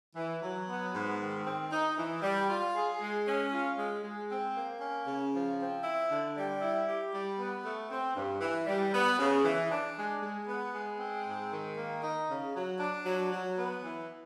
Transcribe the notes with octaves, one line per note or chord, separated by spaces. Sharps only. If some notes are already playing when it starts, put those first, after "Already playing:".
E3
F#3
B3
G#2
D#3
C4
D#4
E3
G3
F4
G#4
G#3
C#4
F4
G#3
G#3
C4
A#3
C#4
C#3
F3
C4
E4
D3
G3
E4
G4
G3
B3
A3
C4
G2
E3
G3
B3
C#3
E3
D4
G#3
G#3
B3
G#3
C4
G#2
D#3
A#3
D#4
C#3
F#3
D4
F#3
F#3
B3
E3